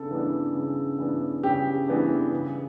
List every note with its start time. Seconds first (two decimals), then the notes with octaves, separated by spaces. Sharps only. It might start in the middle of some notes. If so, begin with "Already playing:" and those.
Already playing: C#3 B3 D4 A4
0.11 E3 B3 D4
0.55 C#3
0.99 E3 B3 D4
1.43 C#3 G4
1.88 E3 B3 D4
2.32 C#3